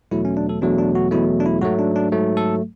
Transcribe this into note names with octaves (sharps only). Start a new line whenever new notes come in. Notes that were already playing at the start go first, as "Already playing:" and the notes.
E2 B2 F#3 A3 E4
C#4
D4
A4
E2 B2 F#3 A3 D4
D4
F#4
E2 B2 F#3 A3 E4
D4
E4
G#2 F#3 A3 F#4
D4
D4
G#2 F#3 A3
A4